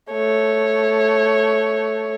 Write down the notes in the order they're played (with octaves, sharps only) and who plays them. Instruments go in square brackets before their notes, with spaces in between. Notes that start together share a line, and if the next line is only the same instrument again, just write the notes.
[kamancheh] A3 C#5